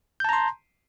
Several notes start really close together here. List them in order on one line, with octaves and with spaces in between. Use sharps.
G6 A5 A#5 C6